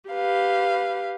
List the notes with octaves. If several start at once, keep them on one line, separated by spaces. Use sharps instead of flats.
G4 B4 F5